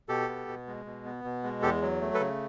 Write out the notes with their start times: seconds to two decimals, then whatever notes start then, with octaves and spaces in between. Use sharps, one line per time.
0.09 B2 G4 A4
0.28 B3
0.48 B2
0.67 G#3
0.86 B2
1.05 B3
1.24 B2
1.43 G#3
1.62 E2 G4 A4
1.82 F#3
2.01 A3
2.14 A4 B4
2.20 C#3